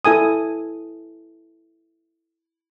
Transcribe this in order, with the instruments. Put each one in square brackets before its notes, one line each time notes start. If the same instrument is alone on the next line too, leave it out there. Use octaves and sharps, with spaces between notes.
[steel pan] E4 A4 G#5 D#6